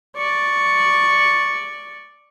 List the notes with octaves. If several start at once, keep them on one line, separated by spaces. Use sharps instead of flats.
D5 C#6